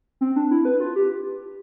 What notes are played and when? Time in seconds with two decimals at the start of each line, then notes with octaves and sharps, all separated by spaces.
0.21 C4
0.36 D4
0.51 E4
0.65 B4
0.80 F4
0.96 G4